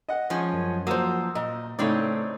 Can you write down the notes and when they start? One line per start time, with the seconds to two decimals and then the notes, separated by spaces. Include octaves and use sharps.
0.09 D#5 F#5
0.30 F3 G#3 C#4
0.53 F#2
0.87 F3 F#3 A#3 C5 D#6 E6
1.35 A#2 D#5
1.79 A2 C#3 A3 C4 D#4 C#5 D5